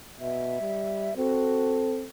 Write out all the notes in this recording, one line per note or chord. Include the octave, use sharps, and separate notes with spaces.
B2 E5
G3
C4 F#4 A4